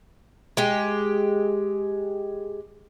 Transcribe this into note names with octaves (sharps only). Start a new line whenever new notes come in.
G#3 G4